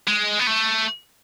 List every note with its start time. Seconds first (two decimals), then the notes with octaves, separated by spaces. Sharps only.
0.08 G#3
0.40 B3
0.47 A3